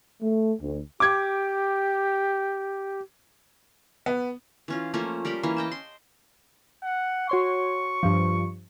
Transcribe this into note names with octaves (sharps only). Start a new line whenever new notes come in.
A3
D2
G4 D6 G#6
B3
E3 C#4 F4
F3 A3 A#3 C#4
G3 A#4 G5 B5
E3 A#3 C#4
D#5 G5 A5
C6
F#5
F#4 C#5 C6 C#6
G2 F3